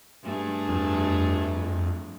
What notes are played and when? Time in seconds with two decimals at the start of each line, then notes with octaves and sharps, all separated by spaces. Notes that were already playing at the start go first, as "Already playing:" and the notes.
0.23 G2 A3 G#4
0.69 F2